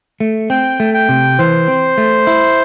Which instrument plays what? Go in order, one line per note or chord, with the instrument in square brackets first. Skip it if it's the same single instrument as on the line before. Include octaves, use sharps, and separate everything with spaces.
[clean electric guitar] A3
[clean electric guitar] C4 [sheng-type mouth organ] G5
[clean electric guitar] A3
[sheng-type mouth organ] G5
[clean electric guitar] C3
[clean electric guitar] E3 [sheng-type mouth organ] C5
[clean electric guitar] C4
A3
E4